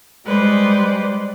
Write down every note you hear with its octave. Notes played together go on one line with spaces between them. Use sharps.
G3 G#3 B4 C5 D5